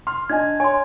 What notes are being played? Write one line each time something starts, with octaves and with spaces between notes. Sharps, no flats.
C6 F6
D4 D#5 G#5 G#6
C#5 G#5 C6